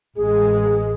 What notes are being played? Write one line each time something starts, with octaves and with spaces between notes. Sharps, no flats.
A1 G#3 G#4